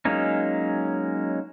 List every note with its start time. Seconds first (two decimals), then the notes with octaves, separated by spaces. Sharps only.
0.05 F#3 G#3 A#3 C#4 D#4